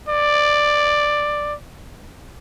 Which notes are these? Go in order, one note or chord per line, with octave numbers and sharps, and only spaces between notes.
D5